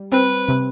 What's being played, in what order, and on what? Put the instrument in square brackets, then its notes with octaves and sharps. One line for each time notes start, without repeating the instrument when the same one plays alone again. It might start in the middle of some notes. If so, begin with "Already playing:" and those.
Already playing: [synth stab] G3
[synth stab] C4 [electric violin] B4
[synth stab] C3